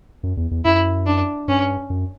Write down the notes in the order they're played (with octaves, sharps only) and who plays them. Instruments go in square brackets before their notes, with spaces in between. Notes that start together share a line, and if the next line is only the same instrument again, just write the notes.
[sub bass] F#2
E2
E2
[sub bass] F#2 [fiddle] E4
[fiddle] D4
[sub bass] G2 [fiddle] C#4
[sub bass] F#2